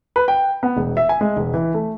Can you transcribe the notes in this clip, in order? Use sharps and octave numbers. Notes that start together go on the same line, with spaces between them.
B4
G5
B3
E1
E5
G#5
G#3
E1
E3
A3